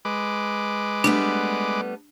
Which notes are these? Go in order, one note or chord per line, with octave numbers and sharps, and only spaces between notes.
G#3 B4 D6
G3 A3 B3 D4